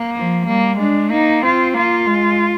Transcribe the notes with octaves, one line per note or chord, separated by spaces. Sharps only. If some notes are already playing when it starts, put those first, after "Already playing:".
Already playing: A#3
F3
G3 A#3
G#3 D4
A#3 D#4
C4 F4
A#3 F4
G#3